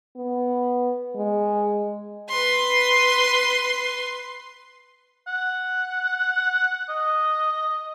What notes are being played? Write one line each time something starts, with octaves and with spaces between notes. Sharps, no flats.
B3
G#3
B4 C6
F#5
D#5